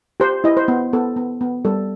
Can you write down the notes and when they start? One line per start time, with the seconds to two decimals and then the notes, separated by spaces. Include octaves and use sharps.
0.20 G4 C5
0.44 E4 D#5
0.57 C5
0.68 B3
0.93 B3 A4
1.16 B3
1.41 B3
1.65 G3 A4